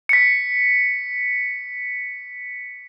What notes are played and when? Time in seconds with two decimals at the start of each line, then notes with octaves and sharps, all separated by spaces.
0.09 B6 C#7